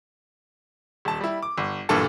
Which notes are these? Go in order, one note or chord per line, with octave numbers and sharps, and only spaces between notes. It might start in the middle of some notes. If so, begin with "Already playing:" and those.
D#1 A5
G3 E4
D6
G1
B1 G2 A#2 E3 A4 A5